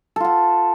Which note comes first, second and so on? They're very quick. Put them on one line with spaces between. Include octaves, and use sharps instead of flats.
A4 F4 F#5